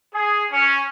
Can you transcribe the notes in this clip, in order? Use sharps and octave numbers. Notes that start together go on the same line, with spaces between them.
G#4
C#4